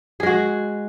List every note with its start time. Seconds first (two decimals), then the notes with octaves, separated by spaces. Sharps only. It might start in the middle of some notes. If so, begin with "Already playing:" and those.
0.20 G#4
0.23 G#3
0.26 F#4